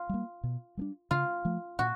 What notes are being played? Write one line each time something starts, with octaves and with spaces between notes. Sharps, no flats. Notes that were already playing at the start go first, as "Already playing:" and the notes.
Already playing: F4
G3 A#3
B2
G3 A#3 D4
C#3 F4
F3 A3
A#2 F#4